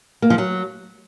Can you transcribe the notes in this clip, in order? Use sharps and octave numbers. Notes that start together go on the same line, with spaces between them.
A#3
F3
F#3